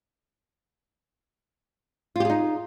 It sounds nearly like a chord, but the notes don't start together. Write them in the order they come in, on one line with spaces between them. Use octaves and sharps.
F4 G4 G#4 D#4